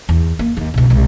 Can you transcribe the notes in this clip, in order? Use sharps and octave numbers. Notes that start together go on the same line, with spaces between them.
E2
A#3
D#2
C#2 B2
C2 G#3